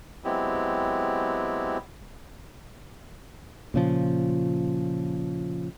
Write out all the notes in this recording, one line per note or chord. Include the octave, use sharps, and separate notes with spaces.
F#3 G#3 B3 C4 E4 G4
A#2 C#3 F3